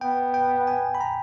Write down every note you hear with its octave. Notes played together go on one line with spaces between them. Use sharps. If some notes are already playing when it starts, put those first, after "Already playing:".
B3 G5
G5
G#5
B5
A#5